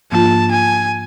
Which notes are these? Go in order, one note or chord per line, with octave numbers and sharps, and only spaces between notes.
G#2 F3 A#3 D4 F4 A5
G#5